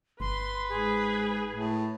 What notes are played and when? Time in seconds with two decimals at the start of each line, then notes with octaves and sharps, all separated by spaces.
0.20 G1 B4 C6
0.69 G#2 G#4
1.49 A2